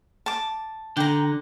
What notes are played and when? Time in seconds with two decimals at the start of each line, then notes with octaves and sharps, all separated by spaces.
0.26 A5 D6
0.97 D3 G5 A#5